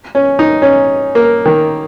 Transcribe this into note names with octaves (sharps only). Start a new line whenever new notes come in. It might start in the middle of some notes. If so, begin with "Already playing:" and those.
C#4
D#4
C#4
A#3
D#3